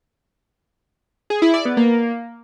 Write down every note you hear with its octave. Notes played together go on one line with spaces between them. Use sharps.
G#4
E4
D5
B3
A#3